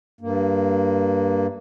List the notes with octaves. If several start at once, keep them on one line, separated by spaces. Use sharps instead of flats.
G2 A#3